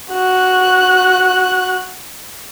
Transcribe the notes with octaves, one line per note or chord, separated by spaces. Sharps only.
F#4 F#6